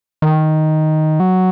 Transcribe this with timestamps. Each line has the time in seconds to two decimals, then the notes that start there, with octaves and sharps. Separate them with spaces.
0.22 D#3
1.20 F#3